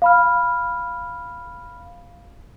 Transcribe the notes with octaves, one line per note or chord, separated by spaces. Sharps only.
F5 B5 F6